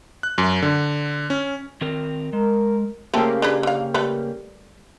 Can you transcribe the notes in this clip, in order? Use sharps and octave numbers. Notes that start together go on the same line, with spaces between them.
F#6
F#2
D3
C#4
D#3 C4 A#4
G#3 A#4
C#3 A3 A#3 C4 G4 A4
D4 G#4 B4
D3 F5
G3 A3 B4